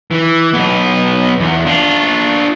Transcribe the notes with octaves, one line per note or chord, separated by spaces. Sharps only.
E3
B1 B3
E2
D4 F4